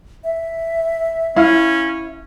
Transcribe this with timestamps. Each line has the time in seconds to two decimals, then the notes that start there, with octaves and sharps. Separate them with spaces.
0.24 E5
1.36 C#4 E4 F5